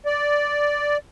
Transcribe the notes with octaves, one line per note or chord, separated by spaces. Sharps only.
D5